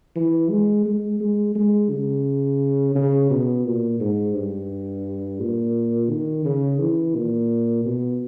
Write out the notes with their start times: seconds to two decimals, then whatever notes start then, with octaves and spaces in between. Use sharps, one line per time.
0.16 E3
0.50 G#3
0.86 G#3
1.20 G#3
1.55 G#3
1.90 C#3
2.95 C#3
3.30 B2
3.65 A#2
4.00 G#2
4.35 G2
5.40 A#2
6.10 D#3
6.45 C#3
6.80 E3
7.15 A#2
7.86 B2